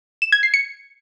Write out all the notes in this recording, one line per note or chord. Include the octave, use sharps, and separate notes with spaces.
E7
G#6
C7
C#7